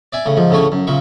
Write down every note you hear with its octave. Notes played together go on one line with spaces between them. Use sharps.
D5 E5 G#5
A2 C#3
G#2 F3
D2 A2 C#3 A3 C#5
F#2
A#2 C#3 E5 C#6